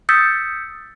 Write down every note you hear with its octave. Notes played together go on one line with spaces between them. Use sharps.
D#6 E6 G6 A6 B6 C#7